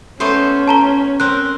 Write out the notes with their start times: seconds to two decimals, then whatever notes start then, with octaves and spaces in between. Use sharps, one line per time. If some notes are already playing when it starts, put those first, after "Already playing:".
0.20 A3 B3 C#4 C5
0.68 A5 A#5 G7
1.20 C4 A#4 F#6